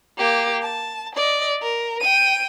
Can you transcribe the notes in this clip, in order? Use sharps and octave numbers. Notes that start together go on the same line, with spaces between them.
A#3 G4
A5
D5 D#5
A#4
G5 D#7